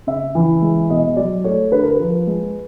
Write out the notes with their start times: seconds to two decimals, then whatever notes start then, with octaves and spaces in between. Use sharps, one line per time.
0.07 C#3 E5
0.35 E3
0.62 G#3
0.90 B2 D#5
1.16 F#3 D5
1.44 A3 C#5
1.71 D3 B4
1.83 A#4
1.95 F3 B4
2.27 G#3